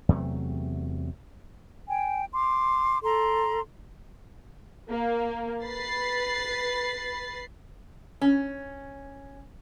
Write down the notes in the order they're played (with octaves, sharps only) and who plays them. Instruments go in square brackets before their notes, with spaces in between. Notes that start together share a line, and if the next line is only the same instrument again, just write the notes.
[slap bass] E2 C3 F#3 A3
[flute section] G5 G#5
C6 D6
A4 A#5 C6
[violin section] A#3
B4 B5 A6 C7
[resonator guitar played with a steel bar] C#4